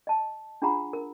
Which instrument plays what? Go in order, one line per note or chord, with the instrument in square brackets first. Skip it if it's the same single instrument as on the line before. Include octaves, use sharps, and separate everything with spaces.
[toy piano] D#5 A5
D4 F4 G#4 F#5 A#5 B5
A#4